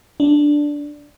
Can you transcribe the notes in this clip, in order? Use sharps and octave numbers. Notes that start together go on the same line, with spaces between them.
D4